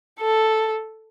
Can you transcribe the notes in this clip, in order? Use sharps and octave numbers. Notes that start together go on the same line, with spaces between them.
A4